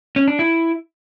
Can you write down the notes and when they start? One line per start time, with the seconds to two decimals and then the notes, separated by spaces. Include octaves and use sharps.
0.16 C#4
0.28 D4
0.39 E4